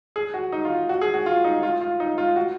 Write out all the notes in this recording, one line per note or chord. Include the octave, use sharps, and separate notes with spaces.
G#4
F#4
D#4
F4
F#4
G#4
F#4
F4
D#4
F4
F4
D#4
F4
F#4